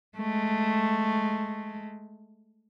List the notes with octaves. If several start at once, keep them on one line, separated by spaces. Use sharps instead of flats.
G#3 A3